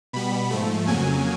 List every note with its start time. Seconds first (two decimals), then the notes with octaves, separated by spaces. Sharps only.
0.13 B2 G3 B3 B5
0.51 G#2 F3 A3
0.87 F2 C#3 F#3 A#3 G#5